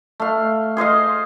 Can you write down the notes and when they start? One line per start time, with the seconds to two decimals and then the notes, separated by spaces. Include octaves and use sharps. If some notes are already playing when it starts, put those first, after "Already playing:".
0.20 A3 F5
0.77 G#4 C5 D#5 F5